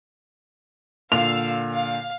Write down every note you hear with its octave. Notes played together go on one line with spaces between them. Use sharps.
A#2 D3 F5 E6 F7
F5